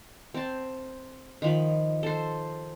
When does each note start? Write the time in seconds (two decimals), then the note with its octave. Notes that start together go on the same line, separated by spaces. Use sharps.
0.34 C4 A5
1.42 D#3 F3 B5
2.03 A4 C5